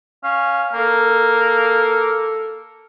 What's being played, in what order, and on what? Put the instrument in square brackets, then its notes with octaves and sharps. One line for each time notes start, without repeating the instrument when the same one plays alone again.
[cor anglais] C#4 [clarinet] F5
[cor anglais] A#3 [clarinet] A4